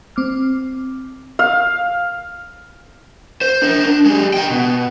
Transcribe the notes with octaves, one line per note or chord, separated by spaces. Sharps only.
C4 D6 F6
F5
C5
D4 A#4
D4
G#3 G4
D#5 G5
B2